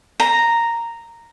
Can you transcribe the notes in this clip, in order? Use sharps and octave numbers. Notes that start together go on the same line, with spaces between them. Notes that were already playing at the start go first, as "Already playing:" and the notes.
A#5